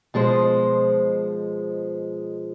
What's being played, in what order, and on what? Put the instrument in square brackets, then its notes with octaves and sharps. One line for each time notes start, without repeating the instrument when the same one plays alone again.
[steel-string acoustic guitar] B2 F3 G#3 C5